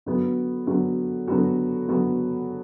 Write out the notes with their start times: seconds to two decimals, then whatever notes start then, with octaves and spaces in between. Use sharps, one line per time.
0.06 D3 F#3 B3 F#4
0.67 D3 F#3 B3 F#4
1.28 D3 F#3 B3 F#4
1.88 D3 F#3 B3 F#4